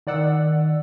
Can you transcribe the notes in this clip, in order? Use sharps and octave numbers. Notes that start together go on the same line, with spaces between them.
D#3 D5 F#5 E6